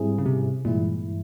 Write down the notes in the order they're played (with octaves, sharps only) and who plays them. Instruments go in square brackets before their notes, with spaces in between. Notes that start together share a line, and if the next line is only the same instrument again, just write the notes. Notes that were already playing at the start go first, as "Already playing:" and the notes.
Already playing: [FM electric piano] G#2 G3 C4 E4 G#4
[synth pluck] C#3
C3
[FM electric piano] G2 E3 G#3 E4 [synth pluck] A#2